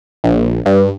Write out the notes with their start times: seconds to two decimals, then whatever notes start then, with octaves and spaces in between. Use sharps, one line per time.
0.24 A#1
0.66 G2